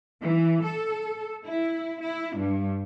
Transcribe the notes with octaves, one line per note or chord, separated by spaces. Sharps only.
E3
A4
E4
E4
G2